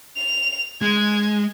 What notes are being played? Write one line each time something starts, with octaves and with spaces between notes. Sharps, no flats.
F7
G#3 G#6